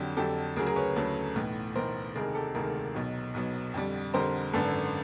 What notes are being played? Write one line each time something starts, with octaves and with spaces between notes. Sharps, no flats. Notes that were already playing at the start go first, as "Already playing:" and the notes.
Already playing: F2 D3 F#3 G4
F2 D3 F#3 G4 A4
D2 C#3 F#3 G#4 A#4
G#4 A#4
B4 C#5
D2 C#3 F#3 A4 B4
B1 A2 E3
B1 A2 E3 A#4 C5
E1 D2 C3 D#3 G#3 G#4 A#4
G4 A4
E1 D2 C3 D#3 G#3 G#4 A#4
B1 B2 F#3
B1 B2 F#3
F2 D3 G3
F2 D3 G3 A#4 C5
G#1 F#2 D3 A4 B4